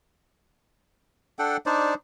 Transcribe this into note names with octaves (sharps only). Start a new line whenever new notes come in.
D4 A4 F#5 G5
D4 D#4 C5 D5